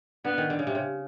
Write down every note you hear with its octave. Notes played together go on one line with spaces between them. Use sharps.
D3 B3
D#3
D3
C#3
C3
C#3